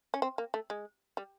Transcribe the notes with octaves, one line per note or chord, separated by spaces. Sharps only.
C#4
C4
A#3
A3
G#3
G3